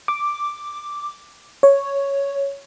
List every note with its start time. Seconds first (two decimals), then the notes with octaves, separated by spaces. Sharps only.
0.08 D6
1.63 C#5